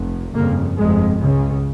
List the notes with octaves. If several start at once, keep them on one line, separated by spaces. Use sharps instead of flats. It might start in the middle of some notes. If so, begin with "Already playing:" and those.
Already playing: F1
G1 F2 C#3 A#3
G1 F2 C3 G#3
C#2 C#3